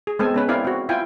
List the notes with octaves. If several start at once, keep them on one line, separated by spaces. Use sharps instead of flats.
G#4
G#3 B3 C4 A4 G#5
B3 C#4 B4
C4 E4 A#4 D5 F5 G#5
C4 F#4
E4 F4 G5 G#5